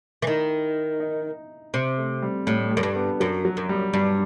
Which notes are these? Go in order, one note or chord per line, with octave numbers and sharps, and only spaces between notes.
E3
D#3 E4
D#4
C3 C4
A3
G3
A2 G3
G3
F#2
G2
B3
F#2 F#3
F#3
F#2
G3
G2 G3